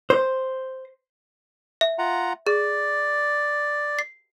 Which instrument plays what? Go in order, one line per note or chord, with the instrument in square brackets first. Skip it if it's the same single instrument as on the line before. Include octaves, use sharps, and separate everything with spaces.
[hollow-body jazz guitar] C5
[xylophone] E5
[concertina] F4 F#5 A#5
[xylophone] G#4 [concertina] D5
[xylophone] C7